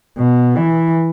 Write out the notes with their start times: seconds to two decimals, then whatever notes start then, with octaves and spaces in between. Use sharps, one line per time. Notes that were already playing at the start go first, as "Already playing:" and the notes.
0.18 B2
0.56 E3